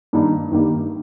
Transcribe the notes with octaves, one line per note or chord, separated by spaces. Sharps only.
G2 D#3 G3 A#3 D#4
G2 D#3 G3 A#3 D#4